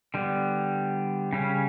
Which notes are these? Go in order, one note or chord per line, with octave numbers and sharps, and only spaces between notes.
D3 G3 B3
C#3 G3 C#4